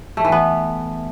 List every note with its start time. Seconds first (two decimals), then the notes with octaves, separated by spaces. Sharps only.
0.17 A3
0.25 E3
0.32 B3